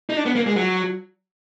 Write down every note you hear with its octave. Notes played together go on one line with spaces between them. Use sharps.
D#4
D4
B3
A#3
G#3
F#3